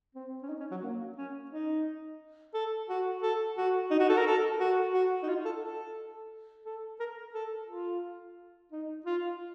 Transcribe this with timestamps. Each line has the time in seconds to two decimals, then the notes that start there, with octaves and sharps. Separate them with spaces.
0.15 C4
0.43 C#4
0.49 D#4
0.60 C#4
0.71 F#3
0.83 A#3
1.18 C#4
1.51 D#4
2.54 A4
2.89 F#4
3.23 A4
3.58 F#4
3.91 D#4
4.00 F#4
4.09 A4
4.17 A#4
4.26 A4
4.60 F#4
4.94 F#4
5.23 D#4
5.29 F4
5.45 A4
5.62 A4
6.66 A4
7.00 A#4
7.34 A4
7.68 F4
8.72 D#4
9.06 F4